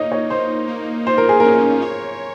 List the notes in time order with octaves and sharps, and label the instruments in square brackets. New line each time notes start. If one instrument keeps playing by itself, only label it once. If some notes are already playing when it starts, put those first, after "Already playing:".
Already playing: [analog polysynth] A#3 D#4 [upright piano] C#5 D#5
[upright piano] C#5
[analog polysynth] D#4 [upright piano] C5
[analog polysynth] A#3
[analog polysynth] F4 [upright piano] C5
[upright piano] A#4
G#4
[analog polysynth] C#4 [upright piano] A#4
[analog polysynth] C#5